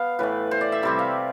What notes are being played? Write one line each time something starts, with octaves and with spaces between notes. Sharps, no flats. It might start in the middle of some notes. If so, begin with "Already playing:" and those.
Already playing: B3 F5
A2 E3 A3 B4
C5
D5
E5
C3 G3 C4 E5
F5